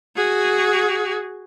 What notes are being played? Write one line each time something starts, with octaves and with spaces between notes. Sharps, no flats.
F#4 G#4